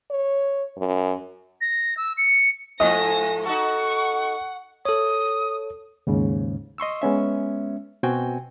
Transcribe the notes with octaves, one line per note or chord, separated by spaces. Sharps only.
C#5
F#2
A#6
E6
C#7
G#2 F3 A3 D#5 G#5 A#6
D#4 F#4 A4 F#5 C#6
A4 C#5 D#6
D#2 G#2 C#3
D#5 C6 C#6 E6
G#3 B3 C#4 E5
B2 C4 F#4 G5 G#5